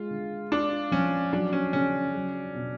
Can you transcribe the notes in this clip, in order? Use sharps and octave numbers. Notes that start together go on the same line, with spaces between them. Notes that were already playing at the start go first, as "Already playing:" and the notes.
Already playing: G#3 F4
D3
G#3 D4
F3 C#4
F#3 D4
C#4
C#3 C#4
F#3
B2